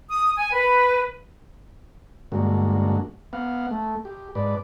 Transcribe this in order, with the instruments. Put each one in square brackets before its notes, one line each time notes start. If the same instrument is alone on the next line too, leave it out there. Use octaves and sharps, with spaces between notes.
[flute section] D#6
G#5
B4
[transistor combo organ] G2 D3 G#3 A#3 F#4
B3 F5 F#5
A3
G4
G#2 B4 D5